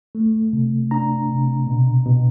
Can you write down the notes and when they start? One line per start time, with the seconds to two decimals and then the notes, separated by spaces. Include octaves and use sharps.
0.15 A3
0.53 C3
0.91 D4 A#5
1.29 C3
1.67 B2
2.06 B2